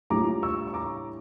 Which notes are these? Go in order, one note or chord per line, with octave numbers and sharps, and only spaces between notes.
A2 G3 D4 F4 A#5 D6
C#6 E6
C#6
A#5 D6